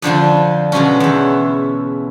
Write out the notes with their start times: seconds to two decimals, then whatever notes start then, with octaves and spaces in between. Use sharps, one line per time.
0.02 F2 D3 F3 F4
0.72 B2 F#3 G#3 C#4
1.00 E2 E4